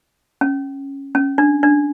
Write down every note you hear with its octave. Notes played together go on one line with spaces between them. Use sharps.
C#4
C#4
D4
D4